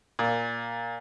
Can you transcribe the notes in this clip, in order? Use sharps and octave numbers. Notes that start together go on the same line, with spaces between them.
A#2